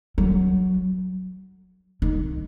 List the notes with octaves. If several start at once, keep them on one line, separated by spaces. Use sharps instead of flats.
F#3
D#3